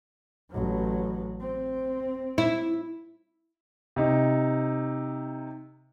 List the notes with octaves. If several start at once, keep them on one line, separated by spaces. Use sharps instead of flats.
A1 F#3
C4
E4
C3 D#4